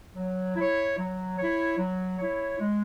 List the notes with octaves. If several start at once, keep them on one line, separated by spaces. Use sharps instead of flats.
F#3
E4 C#5
F#3
E4 C#5
F#3
E4 C#5
G#3